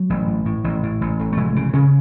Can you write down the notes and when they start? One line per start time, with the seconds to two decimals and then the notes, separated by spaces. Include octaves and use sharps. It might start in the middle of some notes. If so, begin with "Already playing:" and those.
Already playing: F#3
0.10 A1
0.27 A2
0.45 A2
0.64 A1
0.83 A2
1.01 A1
1.19 A1
1.32 A3
1.37 F1 G#3
1.56 C#3
1.74 C#3 C#4